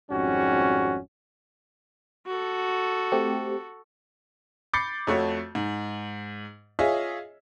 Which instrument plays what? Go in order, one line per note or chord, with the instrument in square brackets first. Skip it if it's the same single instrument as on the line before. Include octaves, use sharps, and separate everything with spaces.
[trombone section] G#1 F2 G#2 G3 C#4 F#4
[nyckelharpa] F#4 A4
[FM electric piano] A3 C4 G4
[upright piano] B5 D6 G6 A6 C7 C#7
F2 A3 F#4 C#5
G#2
F4 G#4 C#5 D#5 E5